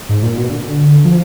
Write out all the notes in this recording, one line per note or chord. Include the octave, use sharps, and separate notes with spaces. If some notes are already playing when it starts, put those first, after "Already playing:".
G#2
A#2
B2
D3
F3